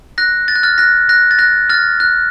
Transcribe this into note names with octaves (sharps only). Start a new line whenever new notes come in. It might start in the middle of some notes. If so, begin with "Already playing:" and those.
F#6 A#6
A6
F#6
F6 A6
F#6 A#6
F#6 A#6
A6
F#6 A#6
F6 A6
F#6